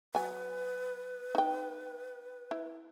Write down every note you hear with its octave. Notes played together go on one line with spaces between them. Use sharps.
F#3 B4 G#5
D#4 G5
E4